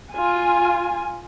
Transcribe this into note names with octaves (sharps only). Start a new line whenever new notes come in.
F4 G#5